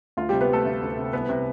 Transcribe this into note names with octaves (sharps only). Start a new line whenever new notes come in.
D2 F4
C3 G3 G4
B3 B4
G3 A3 A4
D2
D2
C3
C2 B3 B4
C3